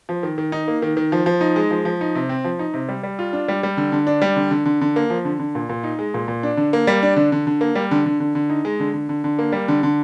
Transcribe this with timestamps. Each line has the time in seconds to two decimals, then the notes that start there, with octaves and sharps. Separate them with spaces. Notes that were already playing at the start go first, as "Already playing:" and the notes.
0.09 F3
0.23 D#3
0.38 D#3
0.52 D#4
0.68 A#3
0.82 D#3
0.97 D#3
1.12 F3
1.26 F3
1.41 D#4
1.56 G#3
1.71 F3
1.85 F3
2.01 D#4
2.15 C3
2.29 C4
2.44 F3
2.59 D#4
2.74 C3
2.89 G3
3.03 G3
3.19 F4
3.33 D4
3.48 G3
3.63 G3
3.77 D3
3.92 D3
4.07 D4
4.22 G3
4.36 D3
4.51 D3
4.66 D3
4.81 D3
4.96 A#3
5.10 F3
5.25 D3
5.39 D3
5.55 A#2
5.69 A#2
5.83 D#4
5.99 G#3
6.14 A#2
6.28 A#2
6.43 D4
6.57 D3
6.73 A#3
6.87 G3
7.03 D4
7.16 D3
7.32 D3
7.47 D3
7.61 A#3
7.75 G3
7.91 D3
8.06 D3
8.20 D3
8.35 D3
8.50 D#4
8.65 G#3
8.80 D3
8.93 D3
9.09 D3
9.24 D3
9.39 A#3
9.52 G3
9.68 D3
9.83 D3